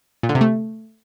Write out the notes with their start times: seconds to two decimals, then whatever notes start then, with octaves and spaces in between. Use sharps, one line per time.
0.23 A#2
0.29 D3
0.35 C3
0.41 A3